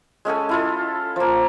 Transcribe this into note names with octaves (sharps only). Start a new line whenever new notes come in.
G#3 C#4 A4 G#5
E4 F4 A4
F3 A#3